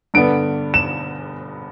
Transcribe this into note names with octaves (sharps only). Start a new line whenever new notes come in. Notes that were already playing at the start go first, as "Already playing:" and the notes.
G2 D3 B3 D4 D7
E7